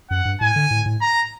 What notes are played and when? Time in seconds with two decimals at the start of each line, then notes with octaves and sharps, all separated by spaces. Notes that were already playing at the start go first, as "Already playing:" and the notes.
0.11 F#2 F#5
0.25 G2
0.41 A2 G#5
0.56 D3
0.71 A2
0.86 A2
1.01 A#5